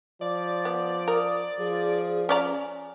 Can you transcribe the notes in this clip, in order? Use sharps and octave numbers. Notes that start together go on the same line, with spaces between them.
F3 D5
B3
A#4 D#6
F3 G#4
C#4 D5 G#5 A#5